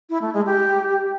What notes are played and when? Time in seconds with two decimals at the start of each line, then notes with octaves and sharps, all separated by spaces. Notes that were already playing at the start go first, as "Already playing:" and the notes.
0.10 E4
0.21 A3
0.33 G#3
0.45 G4